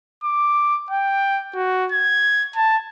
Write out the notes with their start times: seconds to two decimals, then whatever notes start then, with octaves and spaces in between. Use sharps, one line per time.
0.24 D6
0.90 G5
1.55 F#4
1.92 G#6
2.56 A5